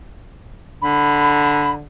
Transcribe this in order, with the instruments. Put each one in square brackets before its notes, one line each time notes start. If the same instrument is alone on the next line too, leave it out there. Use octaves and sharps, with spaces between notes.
[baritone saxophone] D3 [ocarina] B5